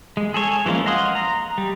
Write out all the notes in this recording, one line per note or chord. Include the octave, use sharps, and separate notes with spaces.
G#3
G#4 A4 C#5 G#5
E3 F3 G#3 A#3 C#4
D#5 F5 F#5 C6 D#6
A#5
G3